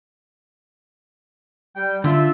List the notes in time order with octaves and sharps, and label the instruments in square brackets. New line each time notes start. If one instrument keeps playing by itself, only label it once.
[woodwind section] G3 G5
[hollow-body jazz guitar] D3 [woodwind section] F4 E5